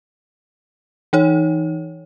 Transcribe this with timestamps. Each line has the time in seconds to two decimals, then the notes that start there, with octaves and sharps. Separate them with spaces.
1.13 E3 D#4 C#5